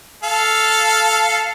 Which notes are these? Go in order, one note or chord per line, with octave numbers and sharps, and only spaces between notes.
A4 F5